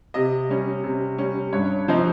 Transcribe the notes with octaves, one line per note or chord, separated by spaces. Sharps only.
C3 D#5
G3 C#4
C3
G3 C#4
G2 C#5
F3 C4 D#4